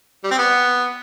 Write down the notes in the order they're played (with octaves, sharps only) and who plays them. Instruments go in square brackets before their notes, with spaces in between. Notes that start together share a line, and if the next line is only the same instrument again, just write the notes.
[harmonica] G3
C4
B3